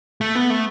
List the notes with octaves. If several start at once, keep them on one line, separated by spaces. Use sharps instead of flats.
A3
B3
A3